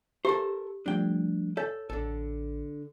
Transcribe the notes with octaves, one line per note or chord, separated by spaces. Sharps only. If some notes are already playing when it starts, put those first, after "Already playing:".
G4 A4 A#4 C5
F3 G3 A3 D4 G5
A4 C#5
A1 D3 A4